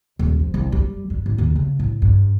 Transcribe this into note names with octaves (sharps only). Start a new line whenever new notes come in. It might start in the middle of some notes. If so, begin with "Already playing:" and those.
D#1
F3
C2
G3
G2
A1
D#2
C#3
A2
G2